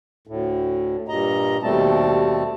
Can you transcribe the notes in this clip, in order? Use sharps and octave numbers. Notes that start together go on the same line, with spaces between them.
D2 A2
G2 A#2 D#5 A#5
D#2 B2 G3 A3 C4 A5